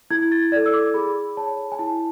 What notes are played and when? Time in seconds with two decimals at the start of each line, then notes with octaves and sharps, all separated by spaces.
0.11 E4 G#6
0.32 A6
0.52 D5 G#6
0.56 A4
0.66 E6
0.74 D6
0.94 G#4 B5
1.37 C#5 A5
1.72 G#5
1.79 E4 A5